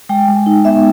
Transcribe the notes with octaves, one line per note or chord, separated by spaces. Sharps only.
G#3 G5
G#3
D#4
B3 E5